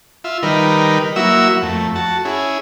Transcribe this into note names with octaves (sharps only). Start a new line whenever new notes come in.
F4 E5
D#3 G3 D#4 A#4 B4
F#3 A#3 E4 F#4 E5 E6
F2 A3
F#4 A5
C#4 E4 G#4